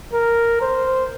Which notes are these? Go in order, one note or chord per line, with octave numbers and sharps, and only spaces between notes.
A#4
C5